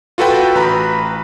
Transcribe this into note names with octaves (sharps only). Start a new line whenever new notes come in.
F4 F#4 A4 B4 G5
A1 B4 A#5 B5